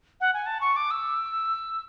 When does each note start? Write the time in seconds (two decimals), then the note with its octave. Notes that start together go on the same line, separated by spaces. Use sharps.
0.21 F#5
0.34 G#5
0.46 A5
0.61 C#6
0.76 D6
0.91 E6